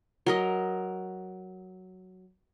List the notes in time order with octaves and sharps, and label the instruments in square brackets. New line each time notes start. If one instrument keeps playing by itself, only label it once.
[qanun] F#3 A#4 D#5